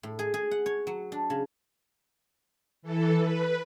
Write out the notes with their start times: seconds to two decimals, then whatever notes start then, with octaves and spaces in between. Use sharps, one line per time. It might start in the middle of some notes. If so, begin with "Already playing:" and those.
0.03 A2
0.19 G#4
0.34 G#4
0.51 F#5
0.66 C#5
0.87 F#3
1.12 D4
1.30 C#3
2.82 E3 A4
3.17 B4